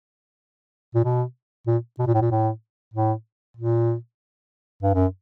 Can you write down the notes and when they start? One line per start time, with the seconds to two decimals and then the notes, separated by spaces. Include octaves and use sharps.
0.95 A#2
1.04 B2
1.67 A#2
1.99 B2
2.07 A#2
2.14 A2
2.22 A#2
2.31 A2
2.94 A2
3.57 A#2
4.83 G2
4.94 F#2